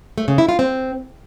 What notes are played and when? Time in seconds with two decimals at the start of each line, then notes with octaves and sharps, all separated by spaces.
0.18 A3
0.28 C#3
0.38 E4
0.49 F4
0.59 C4